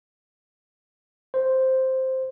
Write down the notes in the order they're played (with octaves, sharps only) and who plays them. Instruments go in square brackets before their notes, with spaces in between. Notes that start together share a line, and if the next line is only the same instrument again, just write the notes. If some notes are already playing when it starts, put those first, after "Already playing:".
[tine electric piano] C5